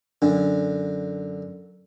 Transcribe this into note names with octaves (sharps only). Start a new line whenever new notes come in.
F#2 D3 D4